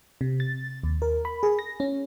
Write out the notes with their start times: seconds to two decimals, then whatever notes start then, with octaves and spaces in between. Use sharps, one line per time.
0.21 C3
0.40 A6
0.83 D#2
1.02 A#4
1.25 B5
1.43 G#4
1.59 A#6
1.80 C#4